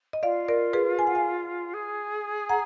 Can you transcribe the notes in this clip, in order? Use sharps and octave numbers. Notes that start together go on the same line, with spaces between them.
D#5
F4 D5 F5
A#4 D5
G#4 B4
G#5
F#5
F5 G#5
G#4
F#5 A#5